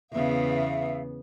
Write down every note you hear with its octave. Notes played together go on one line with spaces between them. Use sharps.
E2 C#3 B3 E5 F5